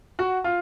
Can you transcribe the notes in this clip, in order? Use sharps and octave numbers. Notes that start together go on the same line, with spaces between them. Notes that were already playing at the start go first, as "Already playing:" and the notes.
F#4 F#5
F4 F5